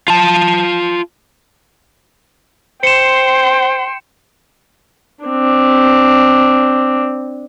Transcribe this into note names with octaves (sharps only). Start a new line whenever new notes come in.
F4 A5
C5 G5 C6 C#7 E7
C4 D4